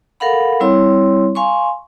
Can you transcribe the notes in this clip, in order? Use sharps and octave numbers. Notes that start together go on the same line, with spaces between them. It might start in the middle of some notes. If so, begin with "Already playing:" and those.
A4 A#4 F5 F#5 B5
G3 C4 E4 C#5 C6
F5 G#5 C6 C#6